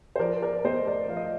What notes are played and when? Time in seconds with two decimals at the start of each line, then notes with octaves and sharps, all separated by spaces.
0.16 C5
0.19 F3 A#4 D5
0.42 A#4 D5
0.65 A3 C5 D#5
0.87 A#4 D5
1.09 F3 F5
1.17 D#5